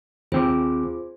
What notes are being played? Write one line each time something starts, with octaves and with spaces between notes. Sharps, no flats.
D#2 C4 F4 G#4 C5 D6